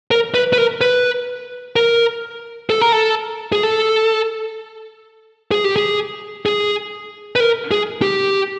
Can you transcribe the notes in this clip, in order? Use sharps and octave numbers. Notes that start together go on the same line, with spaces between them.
A#4
B4
B4
A#4
B4
A#4
A4
A#4
A4
G#4
A4
G#4
G4
G#4
G#4
B4
A#4
G#4
G4